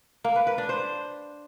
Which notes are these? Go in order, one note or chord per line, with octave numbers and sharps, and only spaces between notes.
A#3
B4
B4
D4
C5